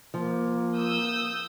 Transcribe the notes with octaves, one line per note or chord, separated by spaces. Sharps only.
F3 A#3
D#6 E6 G6